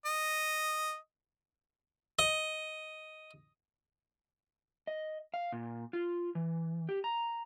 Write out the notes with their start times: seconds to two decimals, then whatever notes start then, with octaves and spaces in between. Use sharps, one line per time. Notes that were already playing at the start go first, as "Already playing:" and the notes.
0.05 D#5
2.19 D#5
4.87 D#5
5.34 F5
5.52 A#2
5.93 F4
6.35 E3
6.89 G4
7.04 A#5